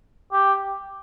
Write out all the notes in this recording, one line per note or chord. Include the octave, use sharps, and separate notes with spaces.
G4